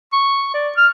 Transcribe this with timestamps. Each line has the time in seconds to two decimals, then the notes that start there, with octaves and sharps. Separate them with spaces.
0.13 C#6
0.54 D5
0.77 F6